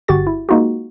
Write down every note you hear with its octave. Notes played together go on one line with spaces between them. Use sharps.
G1 F#4 G4 A6
E4
G#3 A#3 D#4 F4 F#4